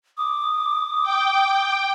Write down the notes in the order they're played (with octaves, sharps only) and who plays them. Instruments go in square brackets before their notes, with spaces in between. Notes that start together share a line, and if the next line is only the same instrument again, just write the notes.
[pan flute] D6 [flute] D#6
[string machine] G5